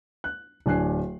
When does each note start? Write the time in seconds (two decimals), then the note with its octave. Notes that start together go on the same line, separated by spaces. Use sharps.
0.24 F#6
0.66 D1 D4 G#5 F#6 C7